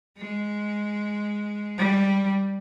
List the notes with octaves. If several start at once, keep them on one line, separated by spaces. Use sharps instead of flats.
G#3
G3